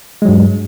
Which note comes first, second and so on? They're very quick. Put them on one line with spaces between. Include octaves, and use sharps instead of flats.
G#3 F#3 G2